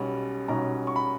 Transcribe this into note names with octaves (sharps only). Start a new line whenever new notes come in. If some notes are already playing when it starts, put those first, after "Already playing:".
Already playing: B1 B2 G3 C#4
B1 B2 G3 C#4 A#5
C#6
B5